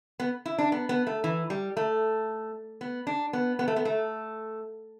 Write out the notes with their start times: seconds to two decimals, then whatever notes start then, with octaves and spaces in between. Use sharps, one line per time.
0.20 B3
0.46 E4
0.58 D4
0.72 B3
0.89 B3
1.07 A3
1.24 E3
1.50 G3
1.77 A3
2.81 B3
3.07 D4
3.33 B3
3.59 B3
3.68 A3
3.76 B3
3.85 A3